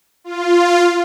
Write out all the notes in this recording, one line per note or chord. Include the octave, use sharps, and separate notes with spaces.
F4